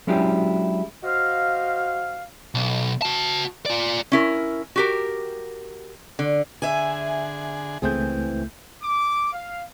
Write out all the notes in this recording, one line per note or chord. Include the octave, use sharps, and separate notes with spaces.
F#3 G#3 C#4 D4 E4 G4
F#4 C5 D#5 F5
B1
F#4 A5
F4 D5
C#4 E4 A#4
F#4 G4 A#4
D3
D3 G#4 E5 G#5
C#2 E3 A3 C4 G#4 G6
D6
F5